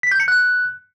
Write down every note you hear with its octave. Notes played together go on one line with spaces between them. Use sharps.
B6
G6
C#7
F#6